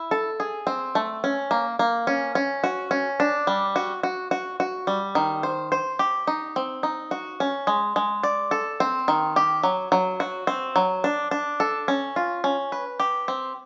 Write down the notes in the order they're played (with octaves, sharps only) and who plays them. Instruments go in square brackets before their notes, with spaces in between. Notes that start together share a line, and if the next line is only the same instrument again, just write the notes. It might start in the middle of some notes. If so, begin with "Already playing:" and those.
Already playing: [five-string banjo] E4
A4
G#4
C4
A3
C#4
A#3
A#3
C#4
C#4
F#4
C#4
D4
G3
F#4
F#4
F#4
F#4
G3
D#3
C5
C5
G4
D#4
C4
D#4
F#4
C#4
G#3
G#3
D5
A4
C4
D#3
G4
F#3
F#3
F#4
C4
F#3
D4
D4
A4
C#4
F4
C#4
B4
G4
C4